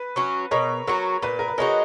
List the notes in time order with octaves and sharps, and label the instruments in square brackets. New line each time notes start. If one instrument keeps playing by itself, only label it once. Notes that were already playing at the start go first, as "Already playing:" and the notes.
Already playing: [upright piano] B4
[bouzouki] F#3 C#4 F#4
[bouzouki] B2 [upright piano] A#4 C#5
[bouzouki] F#3 C#4 F#4 [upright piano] A#4
[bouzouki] A#2 [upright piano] B4
[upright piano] A#4
B4
[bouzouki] G#3 D#4 F#4 [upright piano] A#4 C#5